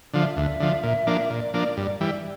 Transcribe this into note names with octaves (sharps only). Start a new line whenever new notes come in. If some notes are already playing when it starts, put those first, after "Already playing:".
D3 F3
E5
D2 E5
D3 F3
A#2
F3 A#3 D4
A#2 D5
F3 A#3 D4
G2
E3 G3